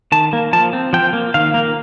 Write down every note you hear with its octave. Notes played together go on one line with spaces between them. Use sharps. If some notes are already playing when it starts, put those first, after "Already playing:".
D#3 A5
A#3
F3 A5
C4
F3 G5
A#3
D#3 F5
A#3